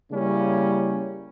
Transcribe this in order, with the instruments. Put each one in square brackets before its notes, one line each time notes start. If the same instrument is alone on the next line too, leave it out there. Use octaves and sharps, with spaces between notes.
[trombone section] C#3 G3 A#3 C#4 E4